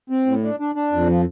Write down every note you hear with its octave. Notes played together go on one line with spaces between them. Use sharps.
C4
A2
D4
D4
D4
F2
F3